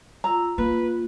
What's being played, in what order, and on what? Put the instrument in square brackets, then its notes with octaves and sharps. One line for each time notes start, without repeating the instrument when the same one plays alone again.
[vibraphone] F4 E6 [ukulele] A#5
[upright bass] A#3 [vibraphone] F4 [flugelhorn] B4